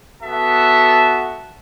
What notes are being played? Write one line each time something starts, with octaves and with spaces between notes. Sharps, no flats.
B3 F#4 A4 E5 A5